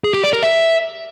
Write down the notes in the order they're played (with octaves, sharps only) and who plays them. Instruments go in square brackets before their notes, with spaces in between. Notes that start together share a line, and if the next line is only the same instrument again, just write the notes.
[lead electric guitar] G#4
G4
D5
A#4
E5